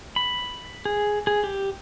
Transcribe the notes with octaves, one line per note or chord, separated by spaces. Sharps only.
B5
G#4
G#4
G4